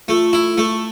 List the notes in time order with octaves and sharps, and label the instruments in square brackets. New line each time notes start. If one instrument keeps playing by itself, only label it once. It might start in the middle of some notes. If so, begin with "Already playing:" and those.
[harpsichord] A3 [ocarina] F4
[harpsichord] E4
A3